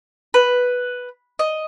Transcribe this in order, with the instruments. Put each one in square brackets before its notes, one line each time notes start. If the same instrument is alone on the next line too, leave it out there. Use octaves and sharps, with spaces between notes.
[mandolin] B4
D#5